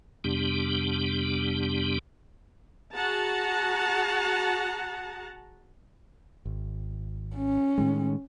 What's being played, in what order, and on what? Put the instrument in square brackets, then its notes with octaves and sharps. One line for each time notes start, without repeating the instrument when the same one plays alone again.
[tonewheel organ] F2 C3 G3 B3 D4 G4
[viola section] F#4 G#4 F#5 A5 A#5
[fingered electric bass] G#1
[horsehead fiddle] C#4
[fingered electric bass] A2 D#3 G#3